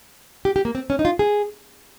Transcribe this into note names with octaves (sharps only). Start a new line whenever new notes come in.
G4
G4
A#3
C4
C#4
D#4
F4
G#4